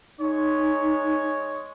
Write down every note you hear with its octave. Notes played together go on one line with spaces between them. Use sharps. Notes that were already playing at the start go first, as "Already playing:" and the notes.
G#3 D#4 C#5